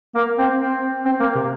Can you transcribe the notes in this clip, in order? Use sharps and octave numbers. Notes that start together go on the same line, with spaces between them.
A#3
C4
C4
C4
A#3
C3